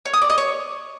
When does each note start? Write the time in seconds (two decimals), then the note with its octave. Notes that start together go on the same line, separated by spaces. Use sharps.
0.05 C#5
0.14 D#6
0.22 D5
0.30 D#5
0.38 C#5